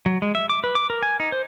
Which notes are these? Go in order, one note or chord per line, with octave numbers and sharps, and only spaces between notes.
F#3
G#3
E5
D6
B4
D6
A#4
G#5
D#4
C5